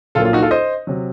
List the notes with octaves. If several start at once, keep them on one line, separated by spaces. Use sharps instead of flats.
A#1 A#2 F#3 A#3 F4 A4
F4
D#4 F#4
F4 A4
C5 D#5
C3 F#3